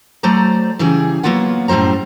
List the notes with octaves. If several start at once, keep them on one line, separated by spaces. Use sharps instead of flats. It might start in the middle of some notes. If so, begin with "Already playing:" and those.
F#3 A3 C5 D5 A#5
C#3 E3 G3 G#4
F#3 G#3 A#3 B3 F4 F#5
F#2 A2 G3 C5 A#5